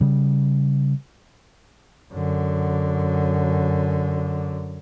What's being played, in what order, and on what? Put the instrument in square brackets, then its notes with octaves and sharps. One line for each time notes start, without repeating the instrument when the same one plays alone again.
[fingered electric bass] C#3 G3
[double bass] F#2 D3